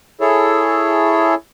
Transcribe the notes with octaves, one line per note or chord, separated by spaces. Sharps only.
E4 G#4 A4 C#5